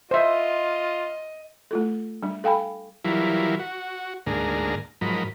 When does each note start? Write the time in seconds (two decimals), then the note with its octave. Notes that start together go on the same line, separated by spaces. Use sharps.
0.11 F4 C5 D#5 E5
1.71 A3 F4 A4
2.23 G3 D4
2.44 A4 F5 G5 G#5 B5
3.05 E3 F#3 G3 E4 F4 A#4
3.60 F#4
4.27 D2 G#2 A#3 D4 G#4 A#5
5.01 G#2 F3 F#3 A#4 D#5 B5